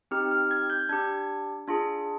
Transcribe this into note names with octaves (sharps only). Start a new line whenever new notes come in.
C4 D#4 G4 F6
F6
G#6
G6
D4 G4 G#6
D4 F4 G#4